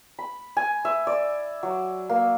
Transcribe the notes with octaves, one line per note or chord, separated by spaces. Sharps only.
B5
G#5
E5
D5
F#3
A#3